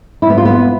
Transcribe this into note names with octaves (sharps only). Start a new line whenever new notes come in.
E4
B3
F4
B3